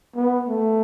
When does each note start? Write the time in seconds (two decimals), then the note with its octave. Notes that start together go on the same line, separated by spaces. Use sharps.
0.16 B3
0.49 A3